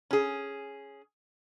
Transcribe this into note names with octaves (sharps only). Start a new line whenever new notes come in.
C#4 G#4